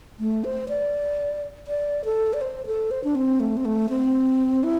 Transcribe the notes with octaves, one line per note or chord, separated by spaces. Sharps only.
A3
C5
D5
D5
A4
D5
C5
A4
C5
D4
C4
A3
C4
A3
C4
E4